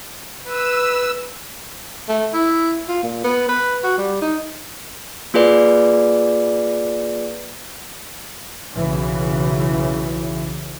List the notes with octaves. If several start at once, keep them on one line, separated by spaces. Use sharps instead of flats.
B4 E6
A3
E4
F4
A#2
B3
B4
F#4
G3
D#4
A#3 F4 G#4 B4 D5
B1 C#3 E3